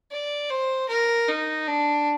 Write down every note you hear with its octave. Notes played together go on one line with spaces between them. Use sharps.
D5
C5
A#4
D#4
D4